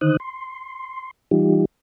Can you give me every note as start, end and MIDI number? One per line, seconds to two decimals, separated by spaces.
0.01 0.17 50
0.01 0.17 51
0.01 0.17 63
0.01 0.17 72
0.01 0.17 87
0.01 0.17 90
0.20 1.11 84
1.31 1.65 52
1.31 1.65 55
1.31 1.65 63
1.31 1.65 65
1.31 1.65 67